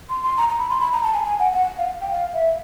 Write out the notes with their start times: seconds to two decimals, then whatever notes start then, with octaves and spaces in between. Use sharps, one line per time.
0.09 C6
0.23 C6
0.37 A#5
0.49 A#5
0.59 B5
0.70 C6
0.81 B5
0.93 A#5
1.03 A5
1.14 G#5
1.24 G#5
1.39 F#5
1.53 F#5
1.78 F5
2.01 G5
2.11 F5
2.34 E5